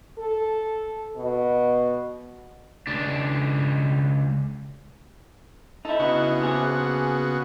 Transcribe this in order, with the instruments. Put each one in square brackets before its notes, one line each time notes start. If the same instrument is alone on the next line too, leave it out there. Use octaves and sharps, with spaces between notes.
[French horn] A4
B2
[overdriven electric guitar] C#2 D4
[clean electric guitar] D#4 E4 [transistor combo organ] A4
[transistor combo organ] C#3 B3 F#4
[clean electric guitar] A#2 G#4